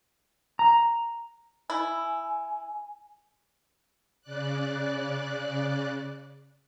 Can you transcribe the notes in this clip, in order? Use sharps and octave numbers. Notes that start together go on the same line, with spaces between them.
A#5
E4 G#5
C#3 D5 F#6